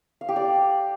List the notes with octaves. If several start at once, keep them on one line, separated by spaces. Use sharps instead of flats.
F5
G4
D5